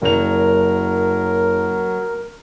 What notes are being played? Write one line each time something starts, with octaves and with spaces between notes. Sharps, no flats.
F#1 F#3 A#4 F7